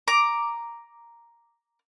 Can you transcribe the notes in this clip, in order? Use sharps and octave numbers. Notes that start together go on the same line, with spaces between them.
A#5 D6